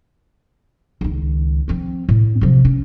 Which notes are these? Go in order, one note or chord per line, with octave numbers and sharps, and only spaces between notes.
C#2 D#3
F3 C4
A2
C3 F3
C#4